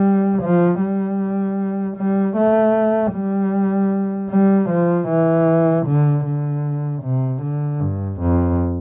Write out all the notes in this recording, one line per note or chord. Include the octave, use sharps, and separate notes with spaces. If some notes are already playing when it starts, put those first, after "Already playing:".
Already playing: G3
F3
G3
G3
A3
G3
G3
F3
E3
D3
D3
C3
D3
G2
F2